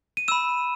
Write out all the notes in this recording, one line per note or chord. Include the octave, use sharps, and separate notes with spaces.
D#7
B5 E6 E7